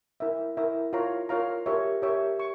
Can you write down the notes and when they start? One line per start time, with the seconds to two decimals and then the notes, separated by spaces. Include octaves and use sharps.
0.20 E4 A#4 E5
0.57 E4 A#4 E5
0.93 F4 A#4 C#5 F5 A#5
1.29 F4 A#4 C#5 F5 A#5
1.66 G4 A#4 C#5 E5
2.02 G4 A#4 C#5 E5
2.40 C#6